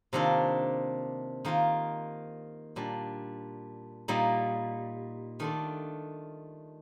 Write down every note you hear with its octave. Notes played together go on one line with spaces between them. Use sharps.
C3 D#3 A#3 D4 F4
D#3 A#3 F4
A#2 G3 D4
A#2 G3 A#3 D#4
D#3 A3 D4 F4